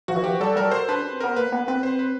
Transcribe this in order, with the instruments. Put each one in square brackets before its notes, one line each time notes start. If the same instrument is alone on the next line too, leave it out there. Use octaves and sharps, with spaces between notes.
[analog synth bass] F3 [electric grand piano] F#4
[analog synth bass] E3
[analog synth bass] F3 [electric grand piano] G4
[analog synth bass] G3 [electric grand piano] A4
[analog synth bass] G3 [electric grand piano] A#4
[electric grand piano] C5
[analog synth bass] D4 [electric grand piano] B4
[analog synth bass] C#4
C4
[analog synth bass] B3 [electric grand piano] A#4
[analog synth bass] A#3 [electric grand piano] B4
[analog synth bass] B3
[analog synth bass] C4 [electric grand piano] B4
[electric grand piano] C5
B4